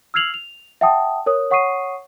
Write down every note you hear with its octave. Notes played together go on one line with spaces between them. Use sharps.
E6 F6 G#6 C7 F7 F#7
F7
E5 F#5 G5 A5 D#6
A#4 C#5 D#6
C#5 F#5 C#6 D#6 C7 D#7